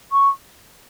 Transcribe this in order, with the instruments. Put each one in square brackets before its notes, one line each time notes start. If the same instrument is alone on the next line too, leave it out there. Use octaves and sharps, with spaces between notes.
[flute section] C#6